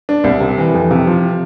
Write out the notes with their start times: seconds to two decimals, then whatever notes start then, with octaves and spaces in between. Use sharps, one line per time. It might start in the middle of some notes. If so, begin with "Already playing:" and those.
0.09 D4
0.24 C2
0.40 C3
0.58 E3
0.74 F2
0.91 C3
1.07 F3